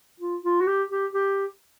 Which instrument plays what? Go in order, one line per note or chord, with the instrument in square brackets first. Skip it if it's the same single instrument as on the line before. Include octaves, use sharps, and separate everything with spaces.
[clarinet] F4
F4
F#4
G4
G4
G4